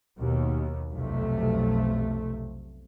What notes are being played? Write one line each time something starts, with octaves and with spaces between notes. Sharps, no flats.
D#2 B2
B1 F2 C3 A3